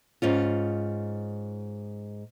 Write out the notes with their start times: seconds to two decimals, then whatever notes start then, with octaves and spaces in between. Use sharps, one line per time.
0.22 G#2 C#4 F4